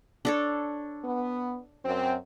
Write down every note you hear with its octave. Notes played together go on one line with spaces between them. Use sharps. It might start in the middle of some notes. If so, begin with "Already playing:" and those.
D4 A4 C#5
B3
F#2 C4